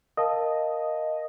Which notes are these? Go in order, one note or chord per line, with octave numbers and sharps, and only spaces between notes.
A#4 D#5 F5 A5